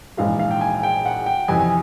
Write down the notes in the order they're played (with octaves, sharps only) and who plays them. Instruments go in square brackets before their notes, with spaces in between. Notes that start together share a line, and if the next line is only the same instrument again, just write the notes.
[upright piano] A#1 G#2 E3 G#3 [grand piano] F5
[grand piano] F5
G5
G#5
G5
F#5
G5
[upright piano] F2 C3 E3 [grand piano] G#5
[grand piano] G#5